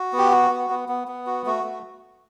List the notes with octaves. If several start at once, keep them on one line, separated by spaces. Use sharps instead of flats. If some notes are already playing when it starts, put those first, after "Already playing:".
Already playing: F#4
B3 G4
F#4
B3
B3
B3
B3
F#4
A3 F#4
A3